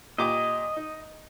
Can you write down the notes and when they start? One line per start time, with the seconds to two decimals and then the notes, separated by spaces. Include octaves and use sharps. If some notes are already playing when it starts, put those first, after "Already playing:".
0.18 A#2 G4 D#5 D6
0.77 D#4